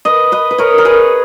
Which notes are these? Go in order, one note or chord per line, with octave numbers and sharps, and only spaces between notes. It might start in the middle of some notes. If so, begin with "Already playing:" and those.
B4 D#5
B4 D#5
B4
A#4 C#5
A#4
G#4 B4